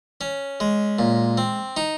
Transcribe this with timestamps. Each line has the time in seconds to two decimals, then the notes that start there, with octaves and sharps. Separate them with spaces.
0.21 C#4
0.60 G#3
0.99 A#2
1.38 C4
1.77 D#4